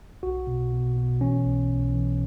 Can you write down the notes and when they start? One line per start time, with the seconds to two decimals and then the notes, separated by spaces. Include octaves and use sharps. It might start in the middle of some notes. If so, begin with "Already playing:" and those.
0.23 B1 F#4
0.47 B2
0.72 B2
0.97 B2
1.21 E3 C#4
1.46 B1
1.71 B1
1.94 E3